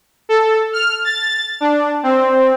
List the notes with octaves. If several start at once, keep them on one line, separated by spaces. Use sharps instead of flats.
A4
F6
A6
D4
C4